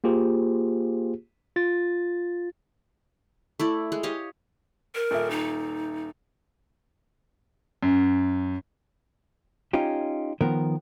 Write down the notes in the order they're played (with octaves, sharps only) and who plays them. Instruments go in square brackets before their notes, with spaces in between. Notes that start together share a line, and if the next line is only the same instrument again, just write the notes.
[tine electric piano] A#3 F4 G4 G#4 C5
F4 A6
[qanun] A3 E4 D5
G#3
G4 C#5 D#5 F5
[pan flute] A#4
[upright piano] D#1 E5
[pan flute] D#4
[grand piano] F#2
[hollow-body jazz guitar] C#4 D#4 F4 G4
D#3 F3 B3 A#4